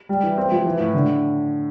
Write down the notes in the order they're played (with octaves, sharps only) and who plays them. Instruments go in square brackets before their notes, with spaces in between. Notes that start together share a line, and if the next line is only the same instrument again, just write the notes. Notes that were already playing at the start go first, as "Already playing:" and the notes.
[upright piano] G3
E3
C4
F3
E3
A2
D3